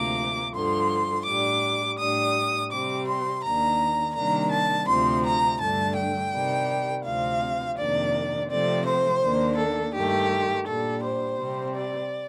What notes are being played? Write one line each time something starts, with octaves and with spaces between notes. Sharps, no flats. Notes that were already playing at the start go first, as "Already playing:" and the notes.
Already playing: D2 C3 F3 A#3 D6
G2 D3 F3 C6
A2 G3 D4 D6
A2 G3 D4 D#6
C3 G3 C4 D6
C6
D#2 D#3 A#3 D4 A#5
C3 D#3 G3 A#3 D4 A#5
A5
D2 C3 F3 C4 C6
A#5
G2 D3 A3 D4 A5
G5
C3 D#3 G3
D2 C3 F3 C4 F5
F2 C3 D#3 A#3 D4 D5
C3 F3 A3 C4 D5
C5
D#2 D#3 A#3 D4
A4
G2 D#3 A3 G4
A#2 G3 D4 A4
C5
C3 G3 C4
D5